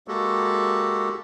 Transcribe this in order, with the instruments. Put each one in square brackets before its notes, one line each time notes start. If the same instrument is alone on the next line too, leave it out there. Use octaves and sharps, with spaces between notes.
[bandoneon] G#3 A#3 F#4 G4 A4